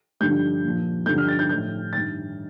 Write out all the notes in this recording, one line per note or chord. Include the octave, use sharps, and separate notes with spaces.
G2 D3 F3 G6
A#2 F3
G2 D3 F3 G6
F6
A6
G6
A2 F3 G6
G2 D#3 A6